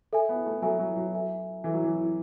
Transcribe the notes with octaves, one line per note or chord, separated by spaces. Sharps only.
A4 E5 G#5
B3
A3
F#3 A4 E5 G#5
F#3
F#3
A4 E5 G#5
E3 A4 E5 G#5
F#3
E3